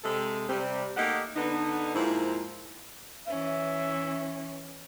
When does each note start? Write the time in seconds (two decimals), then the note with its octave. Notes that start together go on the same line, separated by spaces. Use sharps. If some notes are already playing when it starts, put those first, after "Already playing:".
0.04 C3 G#3 A4
0.49 C3 G3 C4
0.97 A3 A#3 D#4 G4 D#5 F#5
1.36 D3 B3 D#4
1.95 G#2 F3 A#3 C4 E4
3.28 E3 C#4 E5